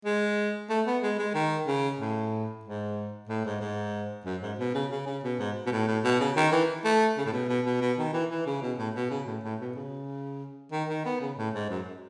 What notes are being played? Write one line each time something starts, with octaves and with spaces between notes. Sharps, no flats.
G#3
A3
B3
G#3
G#3
D#3
C#3
A2
G#2
A2
G#2
G#2
F#2
G#2
B2
C#3
C#3
C#3
B2
G#2
B2
A2
A2
B2
C#3
D#3
E3
A3
C#3
A2
B2
B2
B2
B2
D#3
E3
E3
C#3
B2
A2
B2
C#3
A2
A2
B2
C#3
D#3
D#3
B3
C#3
A2
G#2
F#2